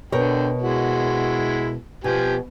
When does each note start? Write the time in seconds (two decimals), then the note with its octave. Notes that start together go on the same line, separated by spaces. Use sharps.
0.12 B2 D3 A#4 C#5 G5
0.62 G#3 E4 F#4
2.04 B2 F3 G4 G#5